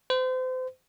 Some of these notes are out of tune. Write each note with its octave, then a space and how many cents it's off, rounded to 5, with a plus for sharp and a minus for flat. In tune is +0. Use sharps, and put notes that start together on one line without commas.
C5 -35